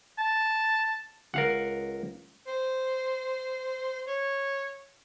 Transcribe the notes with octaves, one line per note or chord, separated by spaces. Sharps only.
A5
C#2 A#4 F5 F#5
C5
C#5